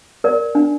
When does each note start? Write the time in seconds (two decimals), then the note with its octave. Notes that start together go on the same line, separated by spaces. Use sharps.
0.24 A#4 D5
0.55 D4